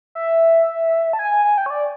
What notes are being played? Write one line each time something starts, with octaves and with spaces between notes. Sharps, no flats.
E5
A5
G#5
G#5
G#5
G5
C#5
D5